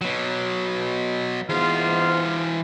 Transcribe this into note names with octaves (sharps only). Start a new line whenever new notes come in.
B2 F#3
G#2 E3 B3 F4 F5